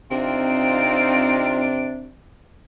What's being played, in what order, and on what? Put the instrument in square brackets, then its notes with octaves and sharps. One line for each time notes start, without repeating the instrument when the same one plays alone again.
[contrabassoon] C3 [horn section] C4 D#4 F4 [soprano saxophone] D4 [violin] D7